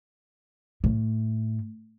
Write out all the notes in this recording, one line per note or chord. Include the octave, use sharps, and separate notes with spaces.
A2